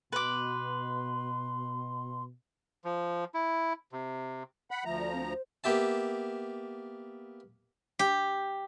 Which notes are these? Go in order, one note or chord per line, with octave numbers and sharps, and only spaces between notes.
B2 B4 C6 D6
F3
E4
C3
F#5 B5
D2 F3 E5 A#5
D5
C4
C5
A#3 B3 G4 E5 A5
G4